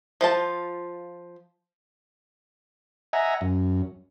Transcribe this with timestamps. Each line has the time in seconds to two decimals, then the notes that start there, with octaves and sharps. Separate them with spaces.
0.21 F3 F4 A5
3.13 D#5 E5 F#5 G#5 A#5
3.41 F#2